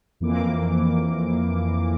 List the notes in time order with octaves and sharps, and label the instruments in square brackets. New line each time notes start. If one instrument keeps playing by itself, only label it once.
[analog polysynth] F2 E3 A#3 D6